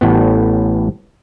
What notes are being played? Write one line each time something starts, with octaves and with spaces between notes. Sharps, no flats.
A1 A2 B3